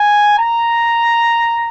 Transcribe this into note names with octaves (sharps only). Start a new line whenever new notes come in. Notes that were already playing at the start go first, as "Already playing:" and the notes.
Already playing: G#5
A#5